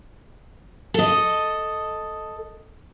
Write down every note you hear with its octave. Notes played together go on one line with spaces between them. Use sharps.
A4 D#5